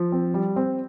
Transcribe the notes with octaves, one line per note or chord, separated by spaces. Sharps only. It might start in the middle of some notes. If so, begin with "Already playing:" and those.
Already playing: F3
C4
G3
C4